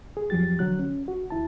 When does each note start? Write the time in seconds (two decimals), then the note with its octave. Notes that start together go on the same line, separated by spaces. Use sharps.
0.17 G#4
0.30 F2 F3 F#3 G4 A6
0.59 D3 F#3 F#6
0.79 C#4
1.08 F#4
1.30 D2 E4 A5